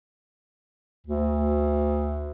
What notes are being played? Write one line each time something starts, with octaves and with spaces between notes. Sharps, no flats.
D2